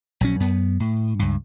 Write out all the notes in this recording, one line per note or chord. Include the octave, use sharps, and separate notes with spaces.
A#1 F#3 C#4
F#2 B3
A2
C#2 G2